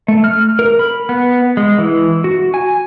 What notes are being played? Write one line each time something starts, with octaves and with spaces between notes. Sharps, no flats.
A3
F6
A#4
B5
B3
G#3
E3
F#4
G#5